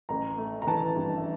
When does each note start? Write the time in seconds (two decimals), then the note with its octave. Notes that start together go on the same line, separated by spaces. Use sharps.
0.09 A1 A#5
0.38 A3
0.62 A#5
0.67 E3 A5
0.96 G2
1.17 E5